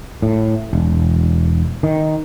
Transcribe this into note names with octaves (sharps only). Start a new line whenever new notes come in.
A2
E1
D#3